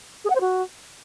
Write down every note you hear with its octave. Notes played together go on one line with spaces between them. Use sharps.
G#4
F#5
C5
F#4